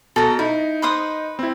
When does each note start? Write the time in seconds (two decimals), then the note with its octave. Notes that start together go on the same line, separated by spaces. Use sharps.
0.16 B2 A4 A#5
0.39 D#4 E4
0.82 B4 C5 D#6
1.39 C4 E4